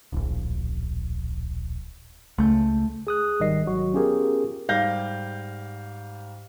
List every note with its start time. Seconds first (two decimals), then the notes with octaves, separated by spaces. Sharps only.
0.12 D1 A#1
2.38 C#2 A3 G6
3.07 G#4 D#6 F#6
3.40 G#1 D#3 G3 D#5 C7
3.66 G#1 F#3 F#4 C#6
3.93 B3 C#4 F4 G4 G#4 A#4
4.68 G#2 G3 F5 G6 A#6